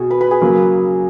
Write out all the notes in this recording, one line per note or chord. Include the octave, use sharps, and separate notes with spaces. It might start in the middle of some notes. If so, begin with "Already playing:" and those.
Already playing: B2 F#4 G#4
B4
B4
G#4
C#3 F#3 A#3 B4